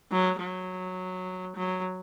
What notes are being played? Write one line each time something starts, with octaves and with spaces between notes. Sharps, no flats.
F#3
F#3
F#3